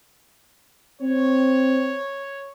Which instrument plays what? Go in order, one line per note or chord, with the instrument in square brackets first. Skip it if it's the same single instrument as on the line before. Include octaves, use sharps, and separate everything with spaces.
[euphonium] C4 [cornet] C#5